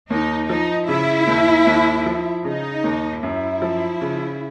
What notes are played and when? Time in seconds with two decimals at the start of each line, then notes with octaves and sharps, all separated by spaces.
0.10 D#2 D#4
0.49 F3 D#4
0.88 C#3 E4
1.27 D#2
1.67 D#2
2.06 F3
2.45 C#3 D#4
2.84 D#2
3.23 F#2 E4
3.62 F3
4.01 C#3